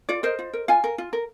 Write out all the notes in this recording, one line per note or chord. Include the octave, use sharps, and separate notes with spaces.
F4 D5
A#4 C5 D#5
F4
A#4
F4 F5 G#5
A#4
F4
A#4